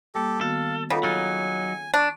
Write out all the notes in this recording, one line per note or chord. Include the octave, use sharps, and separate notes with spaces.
G3 A#3 G4 A4
D#3 B3 F#4 A4 F5
C#3 A#3 B3 D#4 F4 A4 F#5
F#3 D#4 G#5 F6 A6
D4 C#6 D6